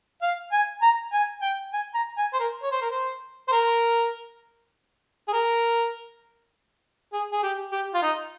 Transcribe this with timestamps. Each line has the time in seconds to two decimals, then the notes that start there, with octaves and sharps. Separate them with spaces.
0.22 F5
0.52 G#5
0.82 A#5
1.13 G#5
1.42 G5
1.73 G#5
1.95 A#5
2.18 G#5
2.33 C5
2.40 A#4
2.63 C#5
2.71 C5
2.82 A#4
2.91 C5
3.48 C5
3.52 A#4
5.28 G#4
5.33 A#4
7.13 G#4
7.32 G#4
7.43 G4
7.72 G4
7.94 F4
8.03 D#4